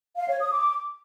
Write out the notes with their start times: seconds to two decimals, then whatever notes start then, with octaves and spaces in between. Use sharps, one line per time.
0.17 F5
0.29 C#5
0.40 D#6
0.52 D6